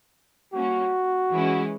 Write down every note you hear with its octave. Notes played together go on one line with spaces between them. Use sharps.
G3 A#3 C#4 F#4
E3 G#3 C#4 E4